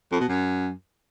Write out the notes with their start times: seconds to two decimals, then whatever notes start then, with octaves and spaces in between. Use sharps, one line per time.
0.12 F2
0.20 B2
0.28 F#2